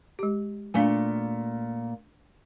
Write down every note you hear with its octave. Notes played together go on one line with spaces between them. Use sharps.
G#3 G4
A#2 A3 D4 F5 G#5